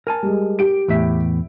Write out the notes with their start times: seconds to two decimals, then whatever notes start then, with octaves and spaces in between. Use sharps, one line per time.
0.07 A#4 G#5 A5
0.23 G3 G#3
0.59 G4 D7
0.88 E2 A2 E5